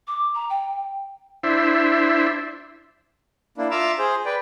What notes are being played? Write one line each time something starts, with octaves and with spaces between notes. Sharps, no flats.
D6
A#5
G5
D4 E4 C5 E5
A#3 D4 E4
F4 E5 F5 A#5 D6 E6
G#4 C5
B4 D5 G5